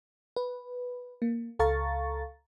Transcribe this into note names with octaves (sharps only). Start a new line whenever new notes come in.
B4
A#3
C#2 A4 F5 A#5 C#6 A6